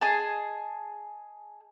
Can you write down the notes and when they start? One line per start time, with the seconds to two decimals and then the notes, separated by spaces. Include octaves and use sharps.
0.01 G#4 D#5 G#5 A5